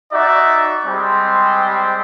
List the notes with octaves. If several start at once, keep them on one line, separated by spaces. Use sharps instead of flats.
D#4 F#4 D5 E5
G3 G#3 C4